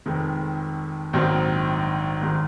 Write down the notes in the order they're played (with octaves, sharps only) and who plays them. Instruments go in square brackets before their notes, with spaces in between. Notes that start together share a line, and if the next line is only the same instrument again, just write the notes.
[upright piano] F1 F2 D#3 G#3
A#1 G#2 D#3 F#3 C4
G#1 G#2 D#3 G#3